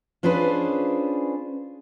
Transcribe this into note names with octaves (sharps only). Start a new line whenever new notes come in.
C#4 D4 F4 G#4 B4 C5